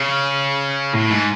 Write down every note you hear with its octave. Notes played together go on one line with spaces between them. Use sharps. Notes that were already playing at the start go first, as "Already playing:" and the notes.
Already playing: C#3
A2
G#2